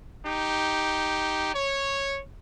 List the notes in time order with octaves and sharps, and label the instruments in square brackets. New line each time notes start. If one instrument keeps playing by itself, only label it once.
[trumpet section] D#4 G4
C#5